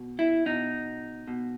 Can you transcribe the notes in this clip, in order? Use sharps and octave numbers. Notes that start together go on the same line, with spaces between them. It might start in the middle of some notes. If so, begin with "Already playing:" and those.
Already playing: B2
E4
B2 D#4
B2